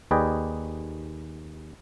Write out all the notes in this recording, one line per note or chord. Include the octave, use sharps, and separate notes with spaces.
D#2 G#4 B4 D5 D#5 G5